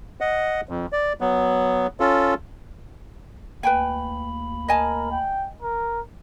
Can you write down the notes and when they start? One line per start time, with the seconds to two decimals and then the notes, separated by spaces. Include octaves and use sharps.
0.21 D#5 F#5
0.69 F2
0.92 D5
1.21 F#3 B3
2.00 C#4 F4 A4
3.63 D2 A#3 B4 G5 G#5 B5
4.68 A#4 D#5 G#5 A5
5.12 G5
5.62 A#4